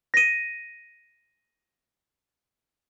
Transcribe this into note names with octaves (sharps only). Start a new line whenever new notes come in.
A#6 D#7